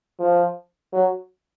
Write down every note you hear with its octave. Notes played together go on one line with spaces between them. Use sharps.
F3
F#3